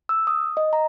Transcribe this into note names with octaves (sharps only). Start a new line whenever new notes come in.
E6
D#6
D#5
A#5